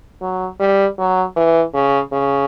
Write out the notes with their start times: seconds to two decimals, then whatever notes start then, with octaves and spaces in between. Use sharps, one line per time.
0.22 F#3
0.60 G3
0.98 F#3
1.36 E3
1.74 C#3
2.12 C#3